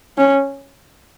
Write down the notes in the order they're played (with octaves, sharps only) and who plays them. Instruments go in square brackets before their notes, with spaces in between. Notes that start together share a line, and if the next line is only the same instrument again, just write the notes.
[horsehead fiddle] C#4